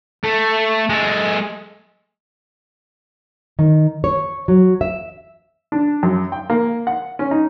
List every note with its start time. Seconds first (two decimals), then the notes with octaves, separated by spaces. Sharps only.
0.24 A3
0.89 G#3 A4
3.59 D#3
4.04 C#5
4.48 F#3
4.81 E5
5.72 D4
6.03 F#2
6.32 G5
6.50 A#3
6.87 F#5
7.19 C#4
7.31 D#4